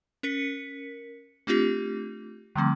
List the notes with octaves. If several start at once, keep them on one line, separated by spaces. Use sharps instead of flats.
C#4 A#4 B6 C#7
A3 C4 D4 F4 G4
D3 F3 G3 A3 C4